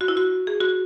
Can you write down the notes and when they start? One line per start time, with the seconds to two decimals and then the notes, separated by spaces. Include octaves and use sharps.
0.01 F#4
0.08 E4
0.17 F#4
0.47 G#4
0.61 F#4